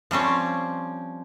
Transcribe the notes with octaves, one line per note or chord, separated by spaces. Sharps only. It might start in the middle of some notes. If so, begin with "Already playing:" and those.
F3 G3 C4 C#4